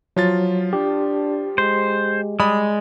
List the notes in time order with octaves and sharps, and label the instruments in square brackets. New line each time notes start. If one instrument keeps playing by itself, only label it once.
[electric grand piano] F3 F4 A6 [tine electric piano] F#3
[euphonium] D4 [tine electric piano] G4
[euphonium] G#3 [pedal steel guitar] C5
[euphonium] G3 [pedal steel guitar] G#3 [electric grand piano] D5 B5 D#6